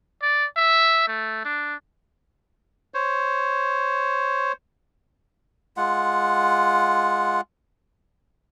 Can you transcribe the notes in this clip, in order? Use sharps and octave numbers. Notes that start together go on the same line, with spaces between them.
D5
E5
A3
D4
C5 C#5
G#3 F4 F#5